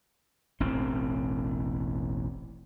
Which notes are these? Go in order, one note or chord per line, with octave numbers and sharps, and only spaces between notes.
E1 A1 C4